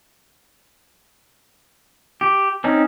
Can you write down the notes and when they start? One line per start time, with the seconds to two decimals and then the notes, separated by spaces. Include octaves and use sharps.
2.21 G4
2.64 C4 C#4 D#4